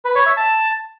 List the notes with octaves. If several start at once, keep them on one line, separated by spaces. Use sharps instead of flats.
B4
C#5
E5
A5